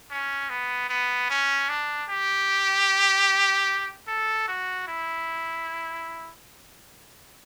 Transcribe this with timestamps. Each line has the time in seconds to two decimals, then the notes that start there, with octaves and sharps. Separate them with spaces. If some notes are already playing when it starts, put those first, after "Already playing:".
0.11 C#4
0.50 B3
0.89 B3
1.30 C#4
1.69 D4
2.10 G4
4.08 A4
4.48 F#4
4.88 E4